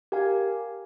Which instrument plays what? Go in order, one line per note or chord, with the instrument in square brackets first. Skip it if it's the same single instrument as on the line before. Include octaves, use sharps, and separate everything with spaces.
[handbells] G4 A#4 F5 G#5